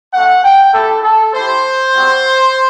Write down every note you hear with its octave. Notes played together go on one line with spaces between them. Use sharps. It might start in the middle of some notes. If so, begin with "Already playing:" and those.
A3 C4 F#4 F#5
G5
A3 E4 G4 A4
A4
A3 E4 G4 C5
G3 C4 F#4